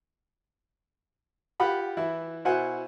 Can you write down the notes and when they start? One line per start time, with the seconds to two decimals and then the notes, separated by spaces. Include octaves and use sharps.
1.60 F4 G4 F#5 B5
1.97 E3 E4
2.45 B2 E4 C5 F#5 G#5